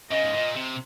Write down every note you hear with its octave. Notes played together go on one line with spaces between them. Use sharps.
C#3 D#5
G#2
A#2
C3